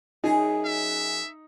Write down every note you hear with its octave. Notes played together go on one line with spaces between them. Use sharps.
F#2 D#4 G#4
E5